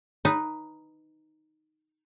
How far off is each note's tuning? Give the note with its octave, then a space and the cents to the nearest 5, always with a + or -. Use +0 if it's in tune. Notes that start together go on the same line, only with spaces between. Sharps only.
D#4 +0 B4 +0